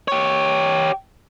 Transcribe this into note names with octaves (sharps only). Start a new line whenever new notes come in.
G4 C#5